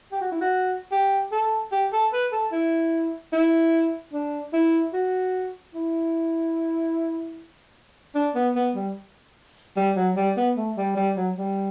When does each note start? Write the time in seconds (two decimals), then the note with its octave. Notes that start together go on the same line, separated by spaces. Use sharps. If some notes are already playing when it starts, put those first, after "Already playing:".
0.12 G4
0.21 F#4
0.32 E4
0.41 F#4
0.91 G4
1.32 A4
1.72 G4
1.93 A4
2.13 B4
2.32 A4
2.52 E4
3.33 E4
4.13 D4
4.53 E4
4.93 F#4
5.74 E4
8.15 D4
8.35 B3
8.56 B3
8.75 G3
9.77 G3
9.96 F#3
10.16 G3
10.37 B3
10.56 A3
10.77 G3
10.97 G3
11.17 F#3
11.37 G3